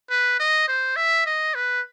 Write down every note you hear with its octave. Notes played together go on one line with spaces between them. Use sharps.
B4
D#5
C5
E5
D#5
B4